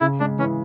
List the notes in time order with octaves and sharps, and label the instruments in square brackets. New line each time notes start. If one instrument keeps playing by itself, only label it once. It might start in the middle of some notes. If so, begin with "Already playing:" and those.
[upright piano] C#3 [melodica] E4
[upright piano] G#3 [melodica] D4
[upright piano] E3 [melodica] C#4